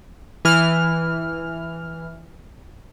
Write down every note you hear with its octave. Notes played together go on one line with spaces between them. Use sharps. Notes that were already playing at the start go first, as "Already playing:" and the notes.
E3 F6